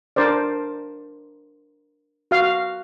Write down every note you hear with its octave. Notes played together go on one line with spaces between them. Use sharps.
D4 A#4 C5 D5
F#4 F5